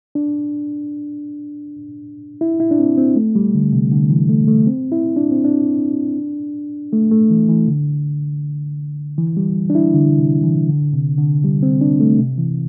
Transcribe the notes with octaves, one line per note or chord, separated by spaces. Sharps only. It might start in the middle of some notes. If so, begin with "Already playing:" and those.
D4
E4
E4
D4
C4
C4
A3
G3
D3
C3
D3
E3
A3
A3
C4
E4
D4
C4
D4
A3
A3
E3
E3
D3
E3
G3
D4
E4
D3
C3
E3
D3
C3
D3
G3
C4
D4
A3
C3
E3